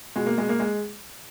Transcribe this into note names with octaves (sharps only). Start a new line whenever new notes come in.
B2 G#3
A#3
G#3
A#3
G#3